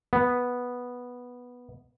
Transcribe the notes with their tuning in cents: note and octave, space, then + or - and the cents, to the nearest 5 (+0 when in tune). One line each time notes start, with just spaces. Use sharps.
B3 -5